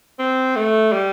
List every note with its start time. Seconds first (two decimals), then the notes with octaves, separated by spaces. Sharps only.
0.19 C4
0.56 A3
0.93 G3